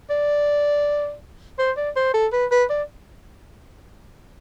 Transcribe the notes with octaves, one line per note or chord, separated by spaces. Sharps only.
D5
C5
D5
C5
A4
B4
B4
D5